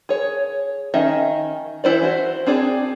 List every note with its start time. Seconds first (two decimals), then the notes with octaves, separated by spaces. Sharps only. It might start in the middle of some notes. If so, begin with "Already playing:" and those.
0.09 G#4 C#5
0.94 D#3 C#4 D#5 E5
1.84 E3 E4 C5 D5
2.03 F#4 C5
2.47 C4 D4 G#4 D5